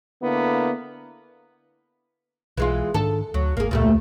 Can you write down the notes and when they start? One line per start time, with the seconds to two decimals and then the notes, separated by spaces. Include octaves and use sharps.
0.22 D3 A#3 B3 E4
2.57 B1 E3 G#3 F4
2.94 G#2 D#3 D4 A4
3.34 D2 F#3
3.57 G#1 A#3 G#4
3.71 E1 C#2 A#2 G3 A3